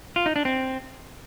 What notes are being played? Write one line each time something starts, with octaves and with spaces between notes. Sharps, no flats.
F4
D#4
D4
C4